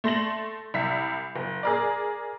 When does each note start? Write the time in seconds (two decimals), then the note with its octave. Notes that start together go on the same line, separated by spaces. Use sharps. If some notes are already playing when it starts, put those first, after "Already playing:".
0.04 A3 C6 A#6 F#7
0.74 C2 E5 B6
1.36 F#1
1.63 G#4 A#4 D5